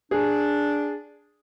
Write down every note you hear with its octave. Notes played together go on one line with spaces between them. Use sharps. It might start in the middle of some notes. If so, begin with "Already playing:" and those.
D4 G#4